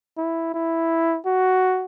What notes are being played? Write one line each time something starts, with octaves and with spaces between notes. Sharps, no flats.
E4
E4
F#4